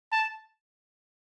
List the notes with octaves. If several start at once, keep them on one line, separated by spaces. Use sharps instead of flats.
A5